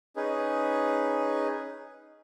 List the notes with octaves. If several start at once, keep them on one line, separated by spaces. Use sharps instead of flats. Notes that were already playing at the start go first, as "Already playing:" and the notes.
C#4 D#4 G#4 B4